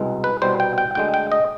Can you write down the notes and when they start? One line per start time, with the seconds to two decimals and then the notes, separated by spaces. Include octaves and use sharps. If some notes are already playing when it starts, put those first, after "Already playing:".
Already playing: C2 B2 G#3
0.24 B4
0.42 C2 B2 G3 C5
0.60 G5
0.78 G5
0.95 D2 D3 G#3 G5
1.14 G5
1.32 D#5